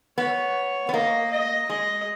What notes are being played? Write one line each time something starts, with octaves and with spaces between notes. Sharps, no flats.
B3 C#5
B3
A#3 D#5
D#5
G#3 D#5